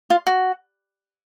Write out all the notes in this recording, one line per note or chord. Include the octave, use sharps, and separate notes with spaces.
F4
F#4